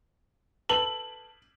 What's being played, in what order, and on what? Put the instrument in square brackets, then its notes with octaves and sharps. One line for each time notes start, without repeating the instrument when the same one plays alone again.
[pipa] A4 B4 [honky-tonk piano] F#7